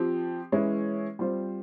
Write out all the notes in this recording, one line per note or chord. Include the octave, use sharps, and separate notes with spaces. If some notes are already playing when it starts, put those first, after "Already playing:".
Already playing: F3 C4 G4
E3 G#3 C#4 E4
G3 C4 F4 C5